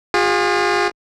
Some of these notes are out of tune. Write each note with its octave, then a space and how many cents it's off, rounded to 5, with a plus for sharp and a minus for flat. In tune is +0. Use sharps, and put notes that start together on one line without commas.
F4 +30 G#4 -35